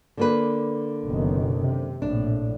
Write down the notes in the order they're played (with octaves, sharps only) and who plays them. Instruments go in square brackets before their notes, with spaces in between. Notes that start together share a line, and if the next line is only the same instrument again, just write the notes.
[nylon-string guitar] D3 A#3 B4
[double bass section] F#1 B2 D#3
C3
[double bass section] A#1 A2 [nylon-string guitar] D4